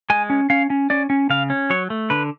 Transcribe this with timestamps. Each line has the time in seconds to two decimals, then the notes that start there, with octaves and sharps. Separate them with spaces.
0.10 G#3 G#5
0.30 C#4
0.50 C#4 F5
0.70 C#4
0.90 C#4 D5
1.10 C#4
1.30 C#3 F5
1.50 C#4
1.70 F#3 C#5
1.90 A3
2.10 D3 B4